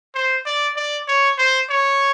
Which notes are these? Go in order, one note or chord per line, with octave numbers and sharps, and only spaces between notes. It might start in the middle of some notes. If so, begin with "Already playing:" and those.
C5
D5
D5
C#5
C5
C#5